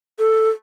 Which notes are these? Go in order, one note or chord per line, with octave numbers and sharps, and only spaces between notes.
A4